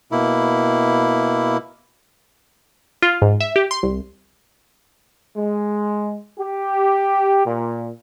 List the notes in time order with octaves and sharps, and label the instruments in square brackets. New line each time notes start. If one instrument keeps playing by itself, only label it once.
[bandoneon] B2 A#3 E4
[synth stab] F4
G#2
E5
G4
C6
C2
[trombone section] G#3
G4
A#2